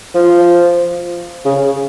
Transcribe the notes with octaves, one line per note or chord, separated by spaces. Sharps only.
F3
C#3